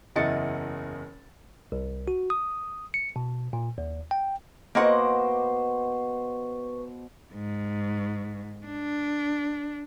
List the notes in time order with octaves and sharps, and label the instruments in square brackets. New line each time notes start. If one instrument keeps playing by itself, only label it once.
[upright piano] F#1 E2 E4 D#5 A6 C#7
[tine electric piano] C2
F#4
D#6
C#7
B2
A#2
D#2
G5
[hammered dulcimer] B2 C5 D6 [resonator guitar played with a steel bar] A#3 D#5 F#5 [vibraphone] B4 C#6
[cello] G#2
D4